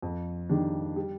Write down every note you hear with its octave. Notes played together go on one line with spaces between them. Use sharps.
F2
D#3 G3 D4
G3